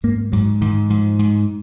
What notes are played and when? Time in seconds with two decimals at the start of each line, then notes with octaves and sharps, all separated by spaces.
0.04 G#2 A#3
0.32 G#2 F#3
0.61 G#2 D#3
0.90 G#2 F3
1.19 G#2